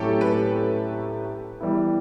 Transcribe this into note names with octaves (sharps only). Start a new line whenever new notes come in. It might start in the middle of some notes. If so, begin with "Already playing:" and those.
Already playing: A2 F#3 A3 C#4 E4 G4 A4
B4
E3 G3 B3 E4